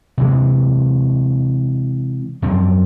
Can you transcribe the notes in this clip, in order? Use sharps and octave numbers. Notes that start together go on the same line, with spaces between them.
C3 E3 G#3
F#2 F3 C4